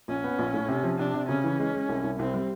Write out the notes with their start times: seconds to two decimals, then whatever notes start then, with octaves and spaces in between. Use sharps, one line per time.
0.08 A#1 C#4
0.24 B3
0.39 A#1
0.54 A2
0.68 C3
0.84 F3
0.98 C3 D4
1.14 C3
1.28 C#3 C#4
1.44 E3
1.59 G#3
1.74 G#3
1.89 C2
2.04 C2
2.19 C2 C4
2.34 G3